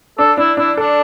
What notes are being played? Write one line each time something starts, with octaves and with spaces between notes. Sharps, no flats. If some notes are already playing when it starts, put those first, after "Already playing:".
D4 A4
D4 E4
D4 E4
D4 A4